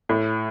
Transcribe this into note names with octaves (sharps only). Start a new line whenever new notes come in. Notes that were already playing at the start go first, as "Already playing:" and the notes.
A2